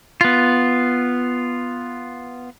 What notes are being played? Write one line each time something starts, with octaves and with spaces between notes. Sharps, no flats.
B3 F4